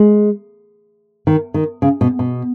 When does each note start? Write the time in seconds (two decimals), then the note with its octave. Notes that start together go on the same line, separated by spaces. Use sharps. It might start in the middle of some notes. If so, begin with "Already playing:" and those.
Already playing: G#3
1.27 D#3
1.54 D#3
1.82 C#3
2.01 B2
2.19 B2